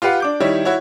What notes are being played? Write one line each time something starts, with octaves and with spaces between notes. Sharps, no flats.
F4 G4 B4 F5 F#5
D4 D6 G6
D#3 G3 E4 C#5
E4 F#4 C#5